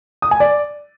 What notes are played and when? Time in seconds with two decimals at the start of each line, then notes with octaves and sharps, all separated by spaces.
0.22 D#6
0.31 G#5
0.40 D5